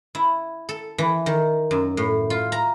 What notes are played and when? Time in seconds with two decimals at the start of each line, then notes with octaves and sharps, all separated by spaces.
0.15 E4
0.69 A4
0.98 E3
1.26 D#3
1.71 F#2
1.97 A2
2.30 F4
2.52 A#5